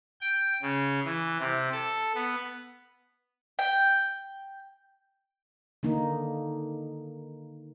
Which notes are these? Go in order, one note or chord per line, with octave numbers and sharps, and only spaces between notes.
G5
C#3
E3
C3
A4
B3
G5
D3 D#3 A#3 D#4